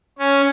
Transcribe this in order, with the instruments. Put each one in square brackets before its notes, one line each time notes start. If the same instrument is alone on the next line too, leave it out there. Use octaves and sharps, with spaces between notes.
[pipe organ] C#4